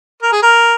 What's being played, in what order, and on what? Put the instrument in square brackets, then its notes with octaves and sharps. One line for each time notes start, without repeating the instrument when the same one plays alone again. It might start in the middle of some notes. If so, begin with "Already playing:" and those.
[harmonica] A#4
G#4
A#4